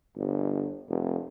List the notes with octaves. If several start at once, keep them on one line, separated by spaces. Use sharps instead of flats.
G1
F1